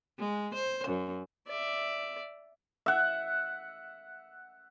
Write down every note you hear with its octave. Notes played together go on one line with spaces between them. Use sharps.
G#3
C5
F#2
D5 E5
E5 F#5